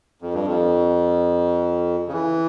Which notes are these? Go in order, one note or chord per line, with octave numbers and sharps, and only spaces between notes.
F2
G2
F2
C#3
E3